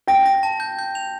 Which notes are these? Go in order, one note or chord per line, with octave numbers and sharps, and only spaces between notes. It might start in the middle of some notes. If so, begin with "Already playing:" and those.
G5 A#6
A#6
A5
G6
G6
F7